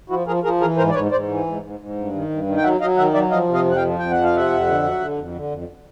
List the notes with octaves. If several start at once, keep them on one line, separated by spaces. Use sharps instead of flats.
F3 E4 F#4
F3 G#4 A#4
F3 G#4 A#4
E3 G#4 A#4
G#2 A#4 C5
D5
G#2 B4 C#5
G#2 C5 D5
E3
G#2
G#2
G#2
G2
D#3
G2
D#3
G5
F#3 E5 F#5
F#3 D#5 F5
D#3 E5 F#5
F#3 D5 E5
F3 D#5 F5
C3
D#5 F5
F2
F#5
F5 G5
F3
F2 G5
F3 F#5
F5
C3 E5 F#5
F2
D3
F#3
D3
F2
D3
F2